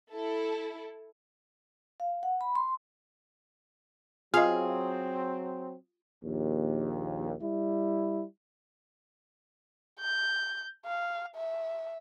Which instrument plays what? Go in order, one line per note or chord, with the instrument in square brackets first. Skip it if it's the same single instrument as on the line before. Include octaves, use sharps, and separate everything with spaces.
[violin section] E4 A4
[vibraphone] F5
F#5
B5
C6
[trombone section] F#3 C4 [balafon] F4 D#5 [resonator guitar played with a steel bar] G#4 [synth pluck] F5
[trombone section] A#1 D#2
G3 E4
[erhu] G6
F5
E5